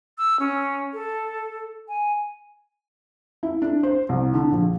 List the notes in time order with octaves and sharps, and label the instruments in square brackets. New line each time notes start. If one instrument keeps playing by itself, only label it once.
[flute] E6
C#4
A4
G#5
[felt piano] E4
D4
C5
C2
D3
A#1